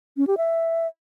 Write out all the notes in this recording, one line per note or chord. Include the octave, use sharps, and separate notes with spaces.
C#4
G4
E5